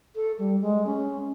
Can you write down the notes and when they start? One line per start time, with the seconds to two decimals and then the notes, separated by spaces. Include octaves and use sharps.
0.15 A4
0.39 G3
0.61 G#3
0.86 C#4